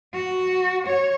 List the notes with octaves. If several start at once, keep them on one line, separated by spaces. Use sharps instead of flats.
F#4
C#5